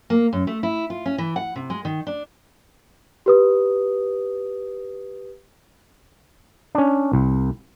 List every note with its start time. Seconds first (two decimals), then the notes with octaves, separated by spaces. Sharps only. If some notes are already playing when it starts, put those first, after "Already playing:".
0.10 A#3
0.33 F#2
0.47 A3
0.63 E4
0.90 F4
1.06 C#4
1.18 E3
1.36 F#5
1.56 C3
1.70 G#3
1.85 D#3
2.07 D4
3.26 G4 B4 D#6
6.75 C#4 D4
7.13 C2